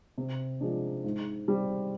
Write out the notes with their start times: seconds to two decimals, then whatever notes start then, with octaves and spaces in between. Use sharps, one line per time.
0.18 C3
0.60 F3 G#3 D4
1.04 G#2
1.48 G3 C4